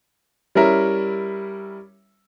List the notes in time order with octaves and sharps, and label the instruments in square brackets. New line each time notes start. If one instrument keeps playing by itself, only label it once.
[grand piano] G3 C#4 E4 A#4 E5